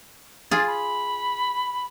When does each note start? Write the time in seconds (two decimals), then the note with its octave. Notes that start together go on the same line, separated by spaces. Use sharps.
0.51 F4 G#4 A6
0.67 B5